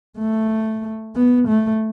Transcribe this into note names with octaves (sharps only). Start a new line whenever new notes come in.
A3
B3
A3